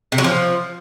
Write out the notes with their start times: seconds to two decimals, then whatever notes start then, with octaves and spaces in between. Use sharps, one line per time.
0.12 C3
0.18 F#3
0.24 F3